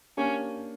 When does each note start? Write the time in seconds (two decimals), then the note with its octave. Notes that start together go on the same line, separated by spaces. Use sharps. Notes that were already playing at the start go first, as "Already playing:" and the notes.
0.17 A#3 C#4 D4 G4